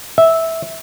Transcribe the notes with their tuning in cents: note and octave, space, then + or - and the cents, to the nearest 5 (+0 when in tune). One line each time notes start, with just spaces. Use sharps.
E5 -10